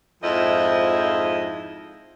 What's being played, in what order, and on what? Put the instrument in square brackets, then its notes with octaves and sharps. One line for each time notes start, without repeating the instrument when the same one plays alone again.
[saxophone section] F2 G#2 F3 E4 C5 D#5